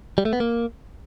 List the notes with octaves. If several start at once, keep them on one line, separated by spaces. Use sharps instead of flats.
G3
A3
B3
A#3